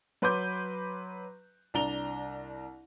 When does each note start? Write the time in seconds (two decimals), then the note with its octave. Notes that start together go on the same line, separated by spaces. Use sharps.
0.22 F#3 B4 C6 D6 G6
1.74 C2 D4 A#5 F7 G7